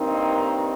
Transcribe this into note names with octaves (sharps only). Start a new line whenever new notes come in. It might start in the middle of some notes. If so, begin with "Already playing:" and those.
Already playing: G2 D#3 A#3 C4 D#4